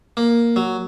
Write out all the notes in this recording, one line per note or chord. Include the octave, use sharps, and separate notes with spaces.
A#3
F#3